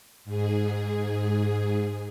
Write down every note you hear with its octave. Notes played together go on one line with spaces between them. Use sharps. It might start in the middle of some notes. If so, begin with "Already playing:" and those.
G#2 G#4